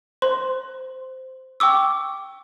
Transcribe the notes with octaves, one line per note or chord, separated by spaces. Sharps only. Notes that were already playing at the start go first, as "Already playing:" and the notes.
C5 C6
G5 C#6 D6 E6